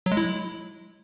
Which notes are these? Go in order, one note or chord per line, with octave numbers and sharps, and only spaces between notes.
F#3
G#3
E4